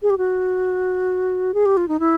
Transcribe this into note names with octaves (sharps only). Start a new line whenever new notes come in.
G#4
G4
F#4
G#4
G4
F4
D#4
E4